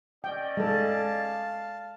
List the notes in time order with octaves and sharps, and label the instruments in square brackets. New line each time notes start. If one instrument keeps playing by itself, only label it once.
[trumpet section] C#4 D5 D#5 [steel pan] G5
[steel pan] G#3 A4 [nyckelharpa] F5 A5